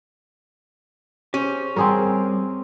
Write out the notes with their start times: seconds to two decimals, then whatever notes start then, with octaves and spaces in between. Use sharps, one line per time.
1.34 C#4 G4 G#4 C5
1.76 G3 C4 G#4 A#4